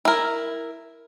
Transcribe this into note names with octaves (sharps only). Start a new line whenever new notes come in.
E4 A#4